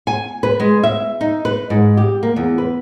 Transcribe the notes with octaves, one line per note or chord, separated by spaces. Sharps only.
G#5
B4
G#3
E5
D#4
B4
G#2
G4
A#3
E2
B4